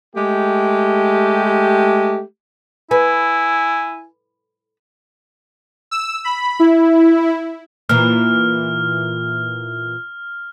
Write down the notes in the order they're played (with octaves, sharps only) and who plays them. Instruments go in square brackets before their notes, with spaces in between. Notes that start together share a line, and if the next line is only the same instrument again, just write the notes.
[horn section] G#3 A3 G4
[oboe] E4 [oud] B4 [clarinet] G#5
[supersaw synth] E6
B5
E4
[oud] A#2 E3 [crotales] F6